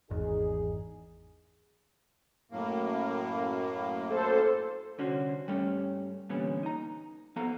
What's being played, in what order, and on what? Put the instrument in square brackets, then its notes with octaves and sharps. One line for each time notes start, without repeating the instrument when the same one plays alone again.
[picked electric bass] G#1 E2 [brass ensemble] D#4 G#4
[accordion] F#2 A2 A#3
[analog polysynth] A4 C5
[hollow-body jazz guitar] C2 D3 C#4 F#4 C5
G2 G3 A3 C#4
E2 A#2 D3 G3 B3 C#4
D#4 A#5
F3 B3 A4 F5 A#5